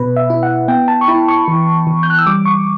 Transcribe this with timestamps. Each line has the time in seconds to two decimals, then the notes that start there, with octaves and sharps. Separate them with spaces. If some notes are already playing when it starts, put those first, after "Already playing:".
Already playing: B2 B4
0.16 E5
0.30 E4
0.43 F#5
0.68 B3 G5
0.88 A5
1.01 C#6
1.08 E4 B5
1.28 C#6
1.48 E3
1.87 E3
2.03 G6
2.10 F#6
2.18 E6
2.26 G3 D6
2.45 C#6